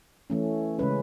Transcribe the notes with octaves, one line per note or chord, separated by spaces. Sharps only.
E3 A3 C#4
C#3 G#3 C#4 B4